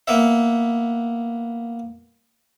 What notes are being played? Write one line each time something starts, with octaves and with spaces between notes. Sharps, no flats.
A#3 B3 E5